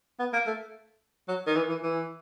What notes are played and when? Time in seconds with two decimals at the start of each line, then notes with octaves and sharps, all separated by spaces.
0.19 B3
0.33 A#3
0.47 A3
1.28 F#3
1.47 D#3
1.56 E3
1.69 E3
1.83 E3